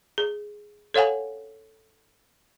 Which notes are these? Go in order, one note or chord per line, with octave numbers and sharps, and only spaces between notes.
G#4
A4 C#5 F5 F#5 G#5